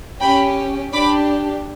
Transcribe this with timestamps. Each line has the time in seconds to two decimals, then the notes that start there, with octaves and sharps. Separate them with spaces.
0.21 C#4 G4 G5 B5
0.92 D4 G4 B5 D6